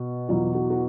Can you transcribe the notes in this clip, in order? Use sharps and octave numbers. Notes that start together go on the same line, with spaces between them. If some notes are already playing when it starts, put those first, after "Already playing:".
Already playing: B2
E2 B2 F#3 F4
F#4
F#4